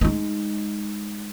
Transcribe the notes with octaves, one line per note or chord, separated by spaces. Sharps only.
G#3 D#4